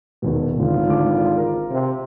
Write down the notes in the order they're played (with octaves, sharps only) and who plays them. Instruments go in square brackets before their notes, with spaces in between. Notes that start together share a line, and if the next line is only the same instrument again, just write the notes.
[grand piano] E1 D#2 B2
[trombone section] G#1 F4 [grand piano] C#2 D3
[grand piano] D3 D4 D6
A#4
[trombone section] C3